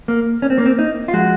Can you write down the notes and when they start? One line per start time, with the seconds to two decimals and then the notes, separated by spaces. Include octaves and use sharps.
0.08 A#3
0.42 C#4
0.50 C4
0.58 A#3
0.66 C4
0.79 D#4
1.08 F4
1.13 F3 G#3 F#4